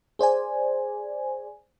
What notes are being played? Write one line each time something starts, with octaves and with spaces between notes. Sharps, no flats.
G#4 C5 D5 G#5